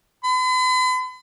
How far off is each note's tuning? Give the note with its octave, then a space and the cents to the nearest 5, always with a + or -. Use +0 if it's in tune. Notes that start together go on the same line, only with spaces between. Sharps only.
B5 +45